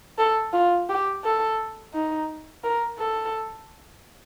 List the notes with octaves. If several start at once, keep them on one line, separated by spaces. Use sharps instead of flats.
A4
F4
G4
A4
D#4
A#4
A4